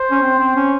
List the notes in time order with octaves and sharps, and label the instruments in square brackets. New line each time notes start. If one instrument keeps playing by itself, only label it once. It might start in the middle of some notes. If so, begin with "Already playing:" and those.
Already playing: [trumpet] C5
[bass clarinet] C#4
C4
C4
C#4